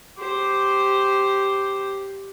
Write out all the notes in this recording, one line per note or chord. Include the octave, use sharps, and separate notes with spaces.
G4 C5